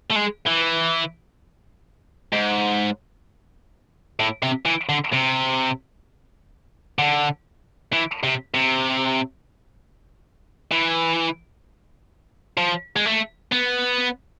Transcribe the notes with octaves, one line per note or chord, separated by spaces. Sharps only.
A3
G#3
E3
G#2
A2
C3
E3
D3
C3
D3
E3
C3
C3
E3
F3
G#3
A3
B3